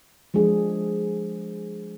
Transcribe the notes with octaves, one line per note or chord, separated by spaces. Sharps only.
F3 G#3 D4 G#4